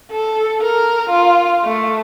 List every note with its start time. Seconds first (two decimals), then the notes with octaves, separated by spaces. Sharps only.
0.11 A4
0.61 A#4
1.10 F4
1.65 A3